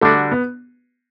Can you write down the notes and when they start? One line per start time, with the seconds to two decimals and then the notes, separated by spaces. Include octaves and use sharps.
0.01 D3 G3 A3 D4 F#4
0.32 B3